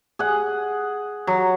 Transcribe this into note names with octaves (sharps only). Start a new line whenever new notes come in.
G#4 F#5
F#3